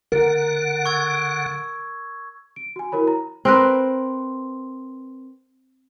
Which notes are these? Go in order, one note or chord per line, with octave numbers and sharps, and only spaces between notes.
D3 A#4 F#5
C#6 E6 G#6
D7
F#4 G#5
E4 F#4 A#4 C#5 B5
A#5
C4 A#4 B4